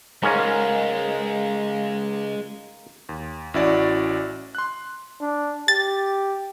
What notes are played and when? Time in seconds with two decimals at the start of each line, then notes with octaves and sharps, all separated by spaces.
0.23 C#2 G#2 G#3 C#4 G#4 A#4 F5
3.09 D#2
3.54 A1 C#4 E4 F#4 D5
4.55 C6 F#6
5.20 D4
5.68 G4 A6